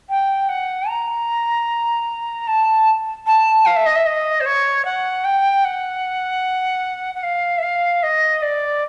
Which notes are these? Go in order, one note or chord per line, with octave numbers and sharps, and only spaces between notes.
G5
F#5
A#5
A5
A5
F5
E5
D#5
E5
D#5
C5
C#5
F#5
G5
F#5
F#5
F5
E5
F5
D#5
D5